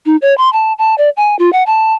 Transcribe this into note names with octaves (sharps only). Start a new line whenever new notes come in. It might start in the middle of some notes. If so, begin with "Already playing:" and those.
D#4
C#5
C6
A5
A5
D5
G#5
F4
F#5
A5